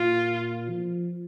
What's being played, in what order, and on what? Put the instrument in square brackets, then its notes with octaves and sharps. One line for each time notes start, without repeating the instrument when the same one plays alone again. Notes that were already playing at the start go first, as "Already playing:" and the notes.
Already playing: [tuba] A#2 [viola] F4
[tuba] F3